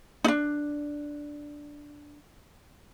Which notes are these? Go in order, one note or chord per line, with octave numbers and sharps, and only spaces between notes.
D4 D#4